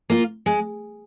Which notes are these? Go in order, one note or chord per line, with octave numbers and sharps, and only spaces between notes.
A#3 F4
G#3